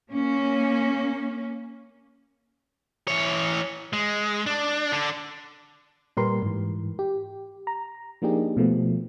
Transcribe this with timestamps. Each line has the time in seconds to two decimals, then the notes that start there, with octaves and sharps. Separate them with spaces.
0.11 A#3 C#4
3.08 E3 C#5
3.93 G#3
4.46 D4
4.92 D3 D4
6.17 A#2 G3 G4 A#4 B4 C6
6.42 G#2 E3
6.99 G4
7.67 A#5
8.22 F3 A#3 D4 D#4 G4 G#4
8.57 B2 F3 A3 B3